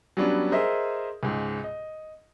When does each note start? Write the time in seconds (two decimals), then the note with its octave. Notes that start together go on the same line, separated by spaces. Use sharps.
0.17 F#3 G3 B3 C#4 D4
0.52 G#4 A#4 C5 D#5 E5
1.23 C#2 G#2
1.64 D#5